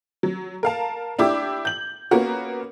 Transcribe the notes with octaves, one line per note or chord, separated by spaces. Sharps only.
F#3
A#4 F5 A5
D4 E4 G4 D6
G6 F#7
A#3 B3 C#4 F#4 A#4